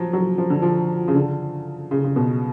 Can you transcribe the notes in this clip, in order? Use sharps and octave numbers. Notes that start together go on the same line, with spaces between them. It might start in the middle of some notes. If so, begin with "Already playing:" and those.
Already playing: F3 F#3
F#3
F3
D3
F3
C#3
D3
C#3
C#3
B2